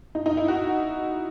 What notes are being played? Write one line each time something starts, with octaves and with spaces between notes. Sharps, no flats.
D#4
D#4
E4
F#4